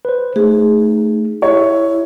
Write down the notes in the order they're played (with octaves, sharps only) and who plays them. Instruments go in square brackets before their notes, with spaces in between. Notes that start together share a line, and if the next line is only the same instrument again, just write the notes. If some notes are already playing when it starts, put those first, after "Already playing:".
[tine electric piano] B4 C5
[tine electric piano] A3 [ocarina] D#4 [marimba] G#4
[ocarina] E4 [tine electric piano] G4 E5 [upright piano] C#5